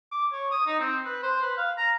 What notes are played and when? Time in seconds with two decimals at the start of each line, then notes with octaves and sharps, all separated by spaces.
0.12 D6
0.32 C#5
0.51 D#6
0.67 D#4
0.80 C4
1.05 B4
1.23 C5
1.42 B4
1.58 F5
1.77 A#5